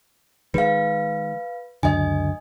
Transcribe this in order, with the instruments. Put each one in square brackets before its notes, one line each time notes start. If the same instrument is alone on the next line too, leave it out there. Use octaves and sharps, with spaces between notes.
[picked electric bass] D#3 G#3 [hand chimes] B4 F5
[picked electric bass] C#2 F#2 D3 [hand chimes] D#5 G#5